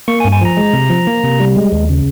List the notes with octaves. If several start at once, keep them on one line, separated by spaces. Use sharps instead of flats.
A#3 C#6
G#5
G2
G#5
F3 A#5
G#3
C3
F3
A#3
C3
G3
G#3
D#2
C#3